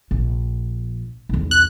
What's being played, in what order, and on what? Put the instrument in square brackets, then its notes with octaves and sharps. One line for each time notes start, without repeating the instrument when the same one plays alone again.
[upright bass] A#1
B1 E2
[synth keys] F#6